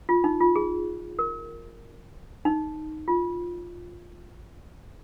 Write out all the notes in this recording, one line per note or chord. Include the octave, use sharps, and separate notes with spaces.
F4
D#4
F4
G#4
A#4
D#4
F4